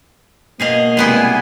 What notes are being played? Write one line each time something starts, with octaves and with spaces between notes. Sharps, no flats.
B2 A#3 G#4 D#5 F5
C3 G3 G#3 B3 E4 G#5